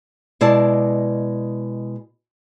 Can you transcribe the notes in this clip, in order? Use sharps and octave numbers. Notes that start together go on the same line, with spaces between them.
B2 G#3 E4 G#4 D5 A5